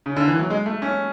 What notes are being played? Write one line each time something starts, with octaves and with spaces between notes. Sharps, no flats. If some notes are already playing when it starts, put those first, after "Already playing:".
C#3
D3
E3
F#3
G#3
A3
C#4